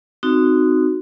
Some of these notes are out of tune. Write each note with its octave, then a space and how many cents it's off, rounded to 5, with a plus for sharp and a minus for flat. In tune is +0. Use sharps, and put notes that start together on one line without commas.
C4 -25 D#4 -5 F#4 +0